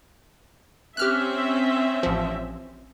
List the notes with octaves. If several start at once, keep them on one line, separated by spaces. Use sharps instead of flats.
C4 C#4 G4 E5 F6 F#6
A1 F3